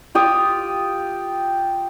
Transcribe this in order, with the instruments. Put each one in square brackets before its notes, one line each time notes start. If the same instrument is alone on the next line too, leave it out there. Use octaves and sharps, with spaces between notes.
[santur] F4 G4 D#6